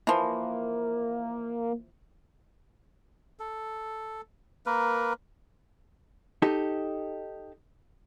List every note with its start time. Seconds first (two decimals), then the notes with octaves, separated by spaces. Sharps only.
0.07 E3 F3 A#3
3.39 A4
4.66 A#3 A#4 B4
6.42 D#4 G4 A4